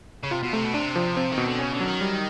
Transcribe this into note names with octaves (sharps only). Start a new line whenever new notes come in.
C#3
C3 F4
B2
C3 A3
B2
C3 D4
F3
C4
D#3
B2
D3
C#3 C#4
D3
F#3
D#3
G3